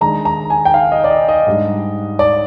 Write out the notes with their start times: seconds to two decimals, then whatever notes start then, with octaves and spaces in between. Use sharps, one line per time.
0.01 D#3 G#3 D4 A#5
0.25 A#5
0.50 G#5
0.65 G5
0.74 F5
0.92 D#5
1.04 D5
1.10 D#5
1.29 D#5
1.47 G#2 G3 D4
2.19 D5